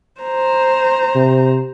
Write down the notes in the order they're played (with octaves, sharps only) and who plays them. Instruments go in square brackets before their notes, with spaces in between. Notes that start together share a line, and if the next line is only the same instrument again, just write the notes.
[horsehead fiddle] C5 A#5
[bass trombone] C3